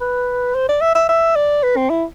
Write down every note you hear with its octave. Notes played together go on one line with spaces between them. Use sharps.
B4
C5
D5
E5
E5
E5
D5
B4
C4
E4